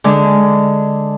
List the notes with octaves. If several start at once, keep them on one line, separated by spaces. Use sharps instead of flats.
D3 G#3 D4